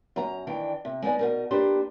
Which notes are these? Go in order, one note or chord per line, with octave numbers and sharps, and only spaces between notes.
F#2 A#5
D#3 E3 D4 G5
C3
G#3 B3 D#4 D5 G#5
B2 D#4 A#4
A#3 D4 G4 B4 C5